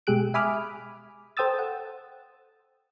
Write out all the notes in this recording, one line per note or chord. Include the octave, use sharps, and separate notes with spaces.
B2 G#3 G4 G#4 F#6 D7
E5 G#5 B5 D6 D#6 F6
A4 C5 G5 D#6 E6 A6
F#5